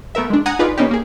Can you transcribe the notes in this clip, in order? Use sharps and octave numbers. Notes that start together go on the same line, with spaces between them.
A3 B3 A#4 E5
G#3 D4
F#5 G#5 A#5 D#6 G#6
D#4 F4 G#4 B4 D5
A#3 B3 C#4 D#4 G4
A#3 G#4